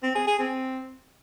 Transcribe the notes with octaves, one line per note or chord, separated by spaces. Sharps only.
C4
G#4
G#4
C4